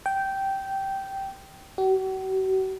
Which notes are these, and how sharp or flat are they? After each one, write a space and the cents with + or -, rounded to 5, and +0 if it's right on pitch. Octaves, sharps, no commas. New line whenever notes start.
G5 -10
F#4 +45